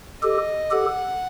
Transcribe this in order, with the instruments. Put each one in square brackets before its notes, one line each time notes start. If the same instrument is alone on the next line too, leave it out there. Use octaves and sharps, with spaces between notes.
[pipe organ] G4 A4 [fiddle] D#5
[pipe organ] G4 A4 [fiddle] F#5